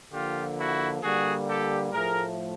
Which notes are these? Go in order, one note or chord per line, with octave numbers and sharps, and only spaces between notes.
D3 F3 A#3 F4 G4
E4 F#4
D3 G3 A#3 F#4 G#4
G4 A4
A2 F3 A3 G#4 A#4